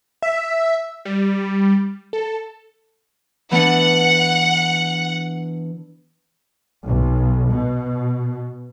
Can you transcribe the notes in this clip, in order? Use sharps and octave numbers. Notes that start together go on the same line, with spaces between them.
E5
G3
A4
E3 B3 D4 F#5
B1
B2